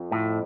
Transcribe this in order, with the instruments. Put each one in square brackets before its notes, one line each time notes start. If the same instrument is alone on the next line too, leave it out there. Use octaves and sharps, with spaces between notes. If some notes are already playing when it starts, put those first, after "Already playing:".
Already playing: [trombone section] F2
[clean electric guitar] A2